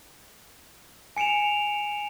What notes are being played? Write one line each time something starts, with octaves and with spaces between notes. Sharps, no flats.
G#5 C#7 D7 E7 F7